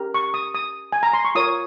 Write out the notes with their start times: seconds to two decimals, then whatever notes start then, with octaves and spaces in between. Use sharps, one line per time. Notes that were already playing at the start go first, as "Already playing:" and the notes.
Already playing: C#4 G4 A#4
0.14 C#6
0.34 D#6
0.55 D#6
0.92 G#5
1.03 A#5
1.13 C6
1.25 C#6
1.35 F4 A#4 C#5 D#6